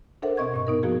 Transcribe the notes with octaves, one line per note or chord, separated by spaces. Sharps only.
D4 A4 A#4 C5 E5 F#5
B2 C4 D#5 C#6 G#6
G2 A#2 C#6
B3 D#4 A#4
F3 A#3 F#4 G#4